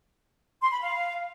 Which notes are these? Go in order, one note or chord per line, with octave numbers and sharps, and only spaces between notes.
C6
B5
F5